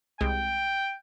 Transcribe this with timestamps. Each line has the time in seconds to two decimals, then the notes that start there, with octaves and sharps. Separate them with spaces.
0.21 C2 G#3 G5